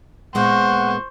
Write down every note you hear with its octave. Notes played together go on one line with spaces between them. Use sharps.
A#2 G#3 B3 C5 F#5 C#6